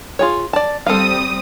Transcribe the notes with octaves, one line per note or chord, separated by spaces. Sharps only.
F4 G#4 C#5
D5 A5
G3 C4 A4 F5 D#6